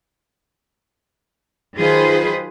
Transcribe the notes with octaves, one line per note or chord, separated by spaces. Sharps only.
D#3 F#3 F4 G#4 B4 C5